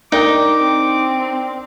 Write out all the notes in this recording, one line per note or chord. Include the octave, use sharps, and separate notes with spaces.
D4 D#4 A#4 G5 D6
C4